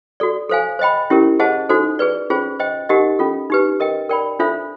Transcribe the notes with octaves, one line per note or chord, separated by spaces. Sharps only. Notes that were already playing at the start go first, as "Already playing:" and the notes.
F#4 A4 D5
A4 C5 F5 G#5
C5 D#5 G5 B5
C#4 E4 G4 A#4
G#4 C5 D#5 F#5 A5
D#4 F#4 A4 C5
G#4 B4 D5
C#4 F4 G#4 C5
C5 D#5 G5
D#4 G4 A#4 D#5 F#5
C#4 F4 A4
D#4 G4 B4
A#4 D#5 G5
A#4 D5 G5 B5
D4 F4 A4 C5 E5